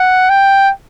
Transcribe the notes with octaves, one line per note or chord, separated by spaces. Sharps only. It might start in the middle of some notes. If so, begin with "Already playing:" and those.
Already playing: F#5
G5